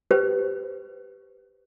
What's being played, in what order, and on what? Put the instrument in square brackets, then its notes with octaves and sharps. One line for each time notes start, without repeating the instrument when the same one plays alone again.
[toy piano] G4 B4 C5